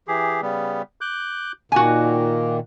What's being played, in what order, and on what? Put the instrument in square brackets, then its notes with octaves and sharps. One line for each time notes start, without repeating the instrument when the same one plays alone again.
[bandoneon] E3 G4 G#4
C#3 G3 B3
D6 F#6 G6
[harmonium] A#2 D#3 [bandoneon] A#3 [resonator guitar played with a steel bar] F#4 G#5